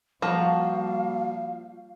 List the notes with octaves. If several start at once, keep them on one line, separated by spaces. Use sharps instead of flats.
F3 G3 A#3 F#4 F5 A5 A#5